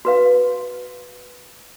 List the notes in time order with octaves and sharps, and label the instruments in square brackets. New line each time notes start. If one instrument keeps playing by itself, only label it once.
[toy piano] F#4 B4 F5